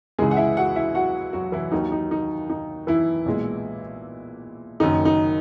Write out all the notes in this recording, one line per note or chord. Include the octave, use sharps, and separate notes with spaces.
C#2 C#3 E3 G#3 G#4
F#5
E4 E5
F#4 F#5
E4 E5
F#4 F#5
F#3 F#4
E3 E4
D#2 D#3 F#3 D#4
D#4
D#4
D#4
E3 E4
B1 A#2 G#3
F#1 F#2 D#3 D#4
D#4